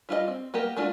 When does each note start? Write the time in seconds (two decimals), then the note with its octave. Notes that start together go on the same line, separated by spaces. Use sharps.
0.09 G3 F4 F#4 D#5
0.28 C4
0.54 A#3 B3 G4 A#4
0.77 G#3 A3 D4 F4 F#4